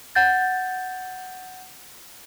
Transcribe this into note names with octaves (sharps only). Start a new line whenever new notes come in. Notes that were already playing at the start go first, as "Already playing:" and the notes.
F#5 G6 A6